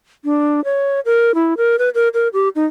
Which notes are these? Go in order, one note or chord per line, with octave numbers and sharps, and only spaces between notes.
D4
C#5
A#4
E4
A#4
B4
A#4
A#4
G4
D#4